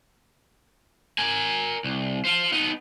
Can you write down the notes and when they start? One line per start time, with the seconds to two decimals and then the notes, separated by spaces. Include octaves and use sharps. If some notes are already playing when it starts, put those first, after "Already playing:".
1.18 A#4 G#5
1.84 C2
2.25 F4 C5
2.53 B3 D#4